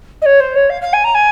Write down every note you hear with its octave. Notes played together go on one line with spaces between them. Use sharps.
D#5
C#5
C5
C#5
F5
F5
G#5
A#5
G#5